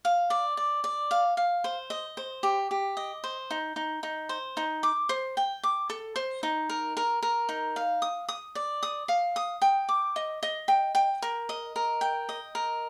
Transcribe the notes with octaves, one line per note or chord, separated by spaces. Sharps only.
F5
D5
D5
D5
F5
F5
C5
D#5
C5
G4
G4
D#5
C5
D#4
D#4
D#4
C5
D#4
D6
C5
G5
D6
A4
C5
D#4
A#4
A#4
A#4
D#4
F5
D#6
D#6
D5
D#6
F5
D#6
G5
D6
D#5
D#5
G5
G5
A#4
D#5
A#4
G5
D#5
A#4